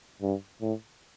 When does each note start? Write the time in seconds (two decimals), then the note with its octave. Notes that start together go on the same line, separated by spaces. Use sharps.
0.22 G2
0.61 A2